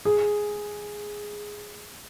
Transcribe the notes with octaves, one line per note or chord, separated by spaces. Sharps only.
G#4